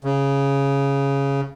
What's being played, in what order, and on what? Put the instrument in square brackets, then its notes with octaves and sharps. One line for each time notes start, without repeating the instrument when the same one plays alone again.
[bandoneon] C#3